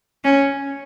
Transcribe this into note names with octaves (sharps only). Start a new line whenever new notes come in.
C#4